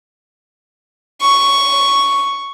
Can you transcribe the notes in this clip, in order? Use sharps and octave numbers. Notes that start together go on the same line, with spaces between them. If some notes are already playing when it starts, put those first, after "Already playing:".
C#6